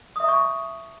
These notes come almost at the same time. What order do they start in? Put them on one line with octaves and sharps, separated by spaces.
D#6 E5 A#5 C#6 A5